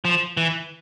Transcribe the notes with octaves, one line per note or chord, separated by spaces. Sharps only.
F3
E3